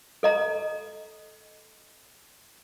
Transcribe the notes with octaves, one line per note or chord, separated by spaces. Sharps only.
A4 D#5 A#5